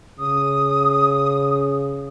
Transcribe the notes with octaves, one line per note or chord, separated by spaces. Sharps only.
C#3 D#6